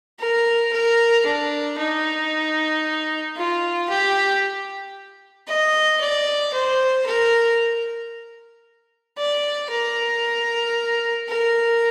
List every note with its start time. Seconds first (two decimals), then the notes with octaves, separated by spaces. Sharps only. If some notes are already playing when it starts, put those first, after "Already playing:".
0.20 A#4
0.72 A#4
1.26 D4
1.78 D#4
3.37 F4
3.89 G4
5.48 D#5
6.01 D5
6.53 C5
7.06 A#4
9.18 D5
9.71 A#4
11.29 A#4